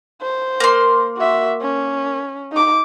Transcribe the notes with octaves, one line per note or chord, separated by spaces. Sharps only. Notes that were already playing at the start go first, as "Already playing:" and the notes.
C5
A#3 C6
F#4 E5
C#4
D#4 D6